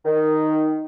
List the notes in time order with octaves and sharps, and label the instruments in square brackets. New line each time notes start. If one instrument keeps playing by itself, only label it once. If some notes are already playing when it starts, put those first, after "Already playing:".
[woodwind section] D#3